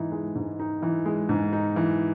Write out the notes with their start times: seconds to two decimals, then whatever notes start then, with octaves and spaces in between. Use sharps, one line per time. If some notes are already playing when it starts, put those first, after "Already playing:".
Already playing: G#2 E3 D#4
0.12 G#3
0.35 G#2
0.59 D#4
0.82 E3
1.06 G#3
1.29 G#2
1.53 D#4
1.76 E3